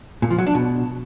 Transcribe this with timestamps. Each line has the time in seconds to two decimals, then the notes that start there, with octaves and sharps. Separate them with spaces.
0.22 A#2
0.30 F3
0.39 F#3
0.47 D4
0.55 B2